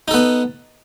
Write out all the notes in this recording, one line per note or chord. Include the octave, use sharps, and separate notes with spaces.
B3 D#4 A4